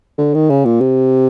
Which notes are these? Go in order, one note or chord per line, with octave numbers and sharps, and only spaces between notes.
D3
D#3
C#3
A#2
C3